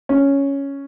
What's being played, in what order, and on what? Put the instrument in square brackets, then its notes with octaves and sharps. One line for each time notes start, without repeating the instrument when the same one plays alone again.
[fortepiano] C#4